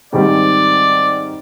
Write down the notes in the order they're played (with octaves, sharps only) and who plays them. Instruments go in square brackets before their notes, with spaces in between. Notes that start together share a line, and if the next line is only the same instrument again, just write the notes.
[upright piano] G#2 D#3 G3 C4 [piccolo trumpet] D5